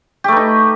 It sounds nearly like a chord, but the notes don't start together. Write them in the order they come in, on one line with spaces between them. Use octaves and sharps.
G4 A3 B4 D#4